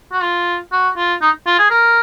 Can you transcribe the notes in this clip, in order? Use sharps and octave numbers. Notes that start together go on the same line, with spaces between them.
F#4
F4
F#4
F4
D#4
F4
G#4
A#4